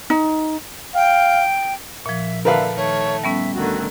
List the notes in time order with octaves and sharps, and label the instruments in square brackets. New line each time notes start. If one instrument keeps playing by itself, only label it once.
[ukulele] D#4
[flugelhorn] F5 [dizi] G5
[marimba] A#2 F3 [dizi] E5
[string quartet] D3 A3 [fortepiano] A#4 B4 F5 [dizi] E5
[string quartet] D#3 A3 [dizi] C#5
[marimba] G3 B3 C#4 [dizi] E5
[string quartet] D2 D3 D#3 [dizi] F#4